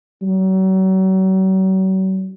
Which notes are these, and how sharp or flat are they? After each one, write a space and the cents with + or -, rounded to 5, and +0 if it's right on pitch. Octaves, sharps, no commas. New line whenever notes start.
F#3 +40